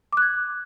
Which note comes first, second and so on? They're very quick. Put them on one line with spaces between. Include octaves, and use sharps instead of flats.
D6 F#6 G#6